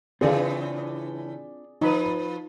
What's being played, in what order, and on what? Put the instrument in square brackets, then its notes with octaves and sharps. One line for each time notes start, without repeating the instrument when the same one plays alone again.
[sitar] A2 C#3 E3 [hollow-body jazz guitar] C4 D4 F4 [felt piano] G#4 D5
[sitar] F3 B4 [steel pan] D#4 B5